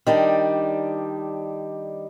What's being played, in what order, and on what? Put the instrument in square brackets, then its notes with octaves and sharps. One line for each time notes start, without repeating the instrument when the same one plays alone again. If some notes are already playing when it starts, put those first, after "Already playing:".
[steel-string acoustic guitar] D#3 G3 D4